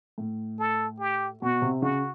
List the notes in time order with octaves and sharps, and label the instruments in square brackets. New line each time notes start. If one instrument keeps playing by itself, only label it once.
[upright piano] A2
[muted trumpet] A4
G4
[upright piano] B2 [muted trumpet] F#4
[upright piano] C3
[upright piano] C#3 [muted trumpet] F#4